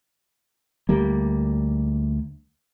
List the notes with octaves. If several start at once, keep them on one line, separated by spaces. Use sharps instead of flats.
D2 G3 A#3